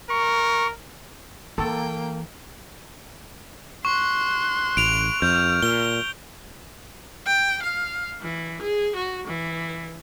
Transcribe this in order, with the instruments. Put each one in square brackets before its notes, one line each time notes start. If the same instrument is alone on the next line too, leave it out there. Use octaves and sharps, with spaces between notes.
[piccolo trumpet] A#4 [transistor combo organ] C#6
[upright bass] E3 [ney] A#3 [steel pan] A4 [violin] G5
[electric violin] C6 F#6 [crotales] C#6
[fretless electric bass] A1 [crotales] D7 F7
[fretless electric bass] F2 [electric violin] F6 [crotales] G6
[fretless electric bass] A#2 [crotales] G7
[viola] G5
F5
E3
G#4
F#4
E3